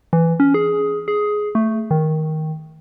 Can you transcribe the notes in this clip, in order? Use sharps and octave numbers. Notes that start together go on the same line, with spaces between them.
E3
C#4
G#4
G#4
A3
D#3